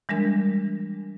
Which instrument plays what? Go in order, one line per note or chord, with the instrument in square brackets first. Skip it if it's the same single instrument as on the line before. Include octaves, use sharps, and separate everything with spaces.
[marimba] E3 G3 G#3 D4 A#4